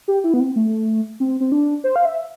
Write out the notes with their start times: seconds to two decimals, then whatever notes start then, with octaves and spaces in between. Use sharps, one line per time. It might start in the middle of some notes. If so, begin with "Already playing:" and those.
0.08 G4
0.24 E4
0.34 B3
0.40 C4
0.56 A3
1.20 C4
1.40 C4
1.52 D4
1.84 C5
1.96 F5
2.05 E5